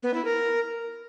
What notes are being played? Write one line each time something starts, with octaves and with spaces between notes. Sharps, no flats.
B3
E4
A#4